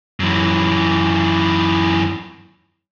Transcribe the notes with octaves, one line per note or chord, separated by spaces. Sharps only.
F#2 E3